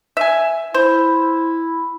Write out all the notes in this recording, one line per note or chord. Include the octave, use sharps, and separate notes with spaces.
E5 G#5
E4 C5